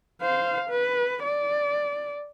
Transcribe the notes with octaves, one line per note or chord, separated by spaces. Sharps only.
C5 F5
B4
D5